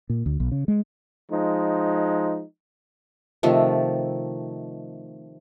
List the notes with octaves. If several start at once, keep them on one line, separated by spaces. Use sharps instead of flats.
A#2
D2
B1
C#3
G#3
F3 G#3 D#4
C3 D#3 F3 A3